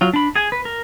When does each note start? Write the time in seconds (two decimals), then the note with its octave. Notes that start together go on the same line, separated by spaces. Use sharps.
0.01 F#3 F4
0.14 D4 B5
0.36 G#4 G#5
0.52 B4
0.65 A#4